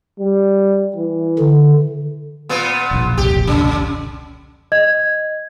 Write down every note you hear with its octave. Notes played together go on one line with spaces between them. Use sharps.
G3
E3
D3
A#2 B3
E1 A#1
F1 C2 G4
C#3
D#5 G#6